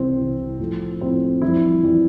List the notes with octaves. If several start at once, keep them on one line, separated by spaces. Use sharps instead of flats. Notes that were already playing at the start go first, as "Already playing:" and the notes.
Already playing: C2 C3 E3 C4
C2 C3 E3
A2 F3 A3
A2 F3 A3 C4
F2 E3 G3 E4
F2 E3 G3